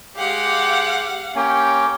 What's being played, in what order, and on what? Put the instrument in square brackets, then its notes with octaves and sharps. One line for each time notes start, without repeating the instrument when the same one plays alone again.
[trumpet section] G#3 G4 [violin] F5 F#5
[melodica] A#3 C#4 [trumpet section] G4 C#5 G5